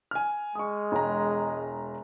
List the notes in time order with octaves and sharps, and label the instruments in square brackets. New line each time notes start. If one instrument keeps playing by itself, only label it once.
[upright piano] G#5 F6
[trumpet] G#3 [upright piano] C#6 D#6
[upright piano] E1 A#5